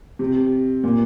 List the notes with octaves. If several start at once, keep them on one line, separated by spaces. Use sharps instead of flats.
C3
A#2